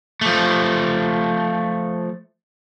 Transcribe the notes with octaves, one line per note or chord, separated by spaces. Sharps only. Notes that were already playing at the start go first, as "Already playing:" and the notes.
F3 A3